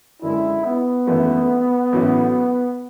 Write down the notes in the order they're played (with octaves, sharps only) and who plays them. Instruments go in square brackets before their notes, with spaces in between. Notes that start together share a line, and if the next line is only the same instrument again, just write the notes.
[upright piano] F#2 D3 G#3 [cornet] E4
[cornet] B3
[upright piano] G#1 F#2 E3 A3 E4
A1 A2 F#3 C#4 F#4